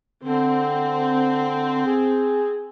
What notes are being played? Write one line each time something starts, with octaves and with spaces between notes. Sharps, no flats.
D3 C4
G#4